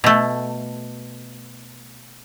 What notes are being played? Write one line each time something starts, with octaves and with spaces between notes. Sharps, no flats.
B2 A3